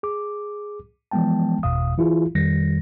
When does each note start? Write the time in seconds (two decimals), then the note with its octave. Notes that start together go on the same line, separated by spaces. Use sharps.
0.03 G#4 D6
1.11 E3 F3 G#3 B3 G5 A5
1.63 G1 E2 B2 F5 D#6
1.98 E3 E4 F4 G#4
2.35 F2 D#3 G3 A#6